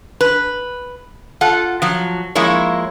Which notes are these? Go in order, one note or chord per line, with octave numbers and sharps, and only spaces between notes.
B4
F4 A4 F#5
F3 F#3
F3 G#3 A#3 E4 C#5